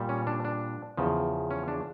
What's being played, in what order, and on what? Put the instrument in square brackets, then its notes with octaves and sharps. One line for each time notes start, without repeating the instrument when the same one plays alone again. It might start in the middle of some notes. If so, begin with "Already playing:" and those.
Already playing: [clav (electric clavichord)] A#2 G3
C#4
D4
D4
E2 C#3 F3
C#4
D4